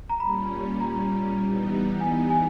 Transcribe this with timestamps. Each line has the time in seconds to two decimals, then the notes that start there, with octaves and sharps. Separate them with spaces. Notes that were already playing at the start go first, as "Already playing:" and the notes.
0.10 A#5
0.20 A#2 G3 C#4 B5
0.80 A#5
1.40 E3 G3 B3 D#4
2.00 G#5
2.30 G#5